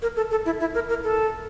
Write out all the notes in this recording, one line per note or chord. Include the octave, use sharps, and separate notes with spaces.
A#4
A4
A4
E4
E4
A#4
A#4
A4